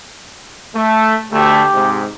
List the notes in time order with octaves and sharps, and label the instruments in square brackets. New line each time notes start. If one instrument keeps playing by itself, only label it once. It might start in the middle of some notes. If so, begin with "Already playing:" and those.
[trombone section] A3
[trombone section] D2 A3 [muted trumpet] G4
[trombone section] G#2 C3